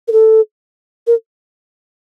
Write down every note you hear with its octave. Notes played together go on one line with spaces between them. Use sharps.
A#4
A4
A#4